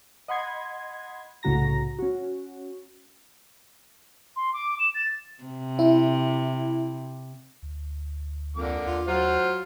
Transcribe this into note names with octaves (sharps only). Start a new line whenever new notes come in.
D#5 F#5 B5 C6 G#6
C2 A2 C#3 F#4 A#5 A#6
C#4 F#4
C6
D6
E7
A6
C3
E4
D2
F2 D3 A#3 D6
D#2 F4
F#3 F4 C5 F5 F#5